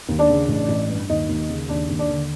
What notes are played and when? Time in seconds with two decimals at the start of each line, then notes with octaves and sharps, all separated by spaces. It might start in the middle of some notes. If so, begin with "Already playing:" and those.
0.09 D#2
0.19 D4 D5
0.29 C#3
0.48 A1
0.69 A1
0.89 G2
1.09 D#2 D#4 D#5
1.29 D#2
1.49 C#3
1.69 D#2 D4 D5
1.89 D#2
1.99 D4 D5
2.10 D3